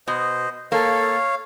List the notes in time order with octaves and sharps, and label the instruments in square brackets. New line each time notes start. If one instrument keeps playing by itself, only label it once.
[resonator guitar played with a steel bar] B2 [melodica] C5 D#5
[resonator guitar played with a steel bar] A#3 [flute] A4 [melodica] C#5 F5